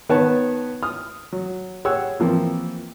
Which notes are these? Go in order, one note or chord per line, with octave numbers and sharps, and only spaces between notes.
D#3 B3 B4 C#5 F#5 A5
D#6 F6
F#3
G4 G#4 C#5 F#5 E6
E3 F3 A#3 C4